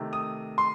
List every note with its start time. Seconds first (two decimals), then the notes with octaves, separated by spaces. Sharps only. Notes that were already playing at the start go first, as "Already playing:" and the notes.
Already playing: C3 D#3 A3
0.13 D#6
0.58 C6